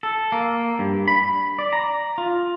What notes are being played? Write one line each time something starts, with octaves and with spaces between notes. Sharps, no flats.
A4
A#3
G2
B5
D5
A#5
F4